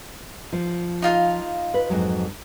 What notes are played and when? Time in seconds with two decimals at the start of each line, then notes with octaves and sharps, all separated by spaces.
0.53 F3
1.02 D#4 F4 F5
1.74 B4
1.90 F2 G#2 F#3